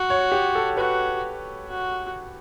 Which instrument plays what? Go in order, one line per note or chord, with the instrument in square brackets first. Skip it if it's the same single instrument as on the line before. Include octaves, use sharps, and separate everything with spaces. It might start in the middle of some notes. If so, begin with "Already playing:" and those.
Already playing: [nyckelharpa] F#4
[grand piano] C#5
G4
A4
[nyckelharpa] F#4 [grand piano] B4
[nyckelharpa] F#4